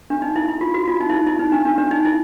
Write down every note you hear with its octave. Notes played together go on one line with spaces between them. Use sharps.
D4
D#4
E4
E4
F4
F#4
F4
D#4
E4
D#4
E4
D#4
D4
D4
D4
D#4
E4